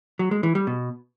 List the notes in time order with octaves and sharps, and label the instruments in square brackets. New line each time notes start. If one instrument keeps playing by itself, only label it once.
[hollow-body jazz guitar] F#3
G#3
E3
G3
B2